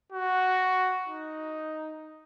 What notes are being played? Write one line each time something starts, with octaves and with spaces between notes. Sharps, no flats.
F#4
D#4